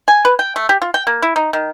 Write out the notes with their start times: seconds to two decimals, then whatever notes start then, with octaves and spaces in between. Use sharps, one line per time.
0.08 G#5
0.25 B4
0.39 G5
0.56 A3
0.69 G4
0.82 F4
0.94 G5
1.07 A#3
1.22 E4
1.36 D#4
1.53 D#3